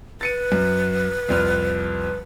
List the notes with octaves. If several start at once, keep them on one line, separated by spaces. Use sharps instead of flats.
B4 A6 C#7 D#7
F#2
C2 F2 F6